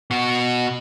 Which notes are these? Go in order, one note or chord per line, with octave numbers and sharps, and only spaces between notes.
B2 F#4